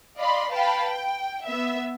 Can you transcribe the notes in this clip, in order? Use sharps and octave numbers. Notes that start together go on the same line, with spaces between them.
D5 D#5 F5 B5 C6
B4 F5 G5 A5 B5
G5
B3 E5